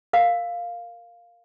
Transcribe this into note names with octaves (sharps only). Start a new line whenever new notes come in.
A#4 F5